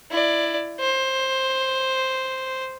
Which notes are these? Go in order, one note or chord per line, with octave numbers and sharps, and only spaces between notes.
E4 D5
C5